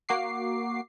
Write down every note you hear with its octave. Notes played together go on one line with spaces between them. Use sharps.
A#3 F#4 D6 C7